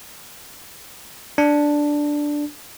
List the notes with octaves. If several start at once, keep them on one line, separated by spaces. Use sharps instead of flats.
D4